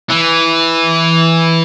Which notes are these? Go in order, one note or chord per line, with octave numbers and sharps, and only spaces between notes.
E3